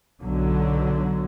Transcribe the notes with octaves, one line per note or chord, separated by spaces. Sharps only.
B1 D3 F#3